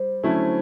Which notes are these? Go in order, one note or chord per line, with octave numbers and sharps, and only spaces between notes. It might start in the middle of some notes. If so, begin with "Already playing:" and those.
Already playing: G3 C5
D3 F#3 A3 C#4 E4